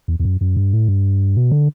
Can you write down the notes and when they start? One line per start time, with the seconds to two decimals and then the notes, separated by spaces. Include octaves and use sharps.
0.08 E2
0.20 E2
0.25 F#2
0.41 F#2
0.56 G2
0.73 A2
0.88 G2
1.36 B2
1.52 D3